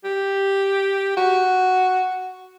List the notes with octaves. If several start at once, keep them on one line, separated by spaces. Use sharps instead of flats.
G4
F#4